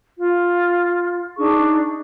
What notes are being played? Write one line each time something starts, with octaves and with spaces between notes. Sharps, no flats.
F4
D4 D#4 G#4 C#6